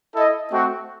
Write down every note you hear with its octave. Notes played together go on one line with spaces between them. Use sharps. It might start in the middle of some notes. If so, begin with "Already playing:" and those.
E4 A4 D#5
A3 C4 F#4